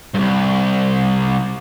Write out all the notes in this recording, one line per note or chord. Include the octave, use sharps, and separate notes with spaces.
C2 G2